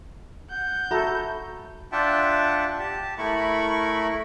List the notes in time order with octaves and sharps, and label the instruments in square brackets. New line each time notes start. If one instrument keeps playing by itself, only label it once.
[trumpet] F#5 [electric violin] G6
[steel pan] F#4 A4 [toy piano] E5 A#5 B5
[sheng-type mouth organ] D4 F4 E5 F#5 G5 A5
G4 A5
A3 E4 A#4 B5 C#6